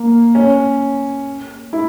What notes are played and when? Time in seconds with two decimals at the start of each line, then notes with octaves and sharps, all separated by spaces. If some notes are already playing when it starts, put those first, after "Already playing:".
Already playing: A#3
0.35 C#4
1.73 E4